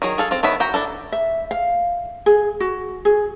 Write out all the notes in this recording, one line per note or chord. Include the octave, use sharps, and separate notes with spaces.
D#3 F#3 G#4
G#4 A4 F5
C4 F4
D#3 B3 C#5 E5 B5
F#4 G5 A#5
D4 E4 A4
E5
F5
G#4
F#4
G#4